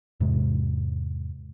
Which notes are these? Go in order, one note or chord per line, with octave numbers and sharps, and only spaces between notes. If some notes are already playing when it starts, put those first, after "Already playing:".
E2 G#2 C3 G#3